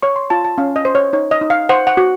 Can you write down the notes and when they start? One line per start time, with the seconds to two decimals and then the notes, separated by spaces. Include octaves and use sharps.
0.02 C#5 C#6
0.16 C6
0.30 F4 A5
0.45 A5
0.58 C#4 F5
0.76 D#5
0.85 C5
0.95 C#5
1.13 D#4 C#5
1.31 D#5
1.41 D#4
1.50 F5
1.69 C5 F#5
1.87 F#5
1.97 F#4